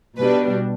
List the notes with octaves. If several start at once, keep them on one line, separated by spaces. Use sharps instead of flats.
B2 G3 D4 B4